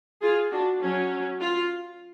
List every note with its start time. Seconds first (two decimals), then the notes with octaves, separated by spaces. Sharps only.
0.22 F4 G#4
0.52 D4 F#4
0.82 F#3 C#4
1.41 F4